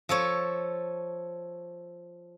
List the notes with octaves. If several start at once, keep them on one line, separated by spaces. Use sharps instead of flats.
F3 A4 C#5